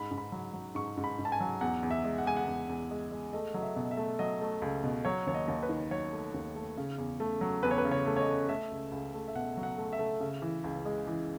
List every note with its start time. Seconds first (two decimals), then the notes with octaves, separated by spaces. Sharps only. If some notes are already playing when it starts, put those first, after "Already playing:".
Already playing: G#2 B5
0.11 G#2
0.18 B5
0.32 F#3
0.53 F#3
0.75 G#2 C#6
0.98 G#2
1.04 B5
1.19 G#2
1.25 A5
1.32 G#5
1.40 F#3
1.61 E2 F#5
1.83 E2
1.91 E5
2.04 G#3
2.18 F#5
2.26 G#3 G#5
2.37 F#5
2.48 E2
2.69 E2
2.91 G#3
3.12 G#3
3.33 A3 D#5
3.54 F#3 D#5
3.62 E5
3.76 B2
3.91 E5
3.97 A3
4.19 F#3 D#5
4.41 A3
4.62 C#2
4.84 B2
5.05 F#3 C#5
5.27 D#2 C#5
5.34 D#5
5.48 D#2
5.63 B4
5.69 D#3
5.91 F#3 C#5
6.13 A3
6.34 D#2
6.56 A3
6.78 C#3
6.98 E2
7.20 A3
7.41 F#3
7.63 E2 B4
7.71 C#5
7.78 B4
7.85 C#3
7.92 C#5
8.06 A3
8.16 C#5
8.20 D#5
8.27 A3
8.49 A3 E5
8.71 C#2
8.92 C#2
9.13 A3
9.28 E5
9.35 B2 F#5
9.57 F#3
9.63 F#5
9.78 A3
9.93 E5
9.99 A3
10.20 C#3
10.42 E3
10.64 C#2
10.86 G#3
11.07 E3